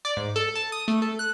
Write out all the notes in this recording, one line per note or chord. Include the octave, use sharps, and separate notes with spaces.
D5
G#2
A4
A5
D#6
A3
A4
F#6